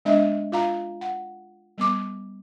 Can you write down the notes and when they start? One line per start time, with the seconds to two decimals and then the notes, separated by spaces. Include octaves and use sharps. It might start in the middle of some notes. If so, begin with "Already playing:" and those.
0.05 G#3 B3 D4 D#5 E5
0.52 F4 F5 A#5
1.01 F#5
1.78 G3 B3 D6